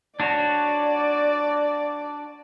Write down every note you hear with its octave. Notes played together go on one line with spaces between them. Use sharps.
D4 F#4 C#5 D5